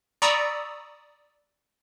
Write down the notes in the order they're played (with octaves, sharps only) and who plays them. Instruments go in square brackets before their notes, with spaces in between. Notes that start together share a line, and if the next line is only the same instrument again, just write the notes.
[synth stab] D5 A#5 B5 C#6 D#6 E6